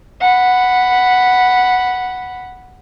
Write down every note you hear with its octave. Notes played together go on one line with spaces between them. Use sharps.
F#5 B5